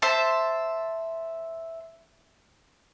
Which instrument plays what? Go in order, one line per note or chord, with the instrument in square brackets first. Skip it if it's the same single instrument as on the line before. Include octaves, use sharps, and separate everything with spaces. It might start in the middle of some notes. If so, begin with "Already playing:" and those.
[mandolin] C5 E5 A5